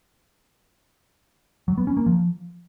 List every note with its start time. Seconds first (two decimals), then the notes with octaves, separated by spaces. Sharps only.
1.68 F#3
1.78 B3
1.87 C#4
1.97 A#3
2.06 F3